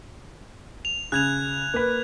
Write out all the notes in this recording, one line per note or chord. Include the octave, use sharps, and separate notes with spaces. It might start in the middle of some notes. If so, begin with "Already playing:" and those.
F7
C#3 F#6 G#6 F7
A#3 B4